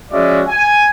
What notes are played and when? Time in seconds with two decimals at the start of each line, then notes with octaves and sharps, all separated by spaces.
0.12 F3 G#3 C#4 F#4 D5 E5
0.48 G#5